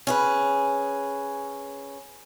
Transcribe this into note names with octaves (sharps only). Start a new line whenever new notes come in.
C#4 G#4 B4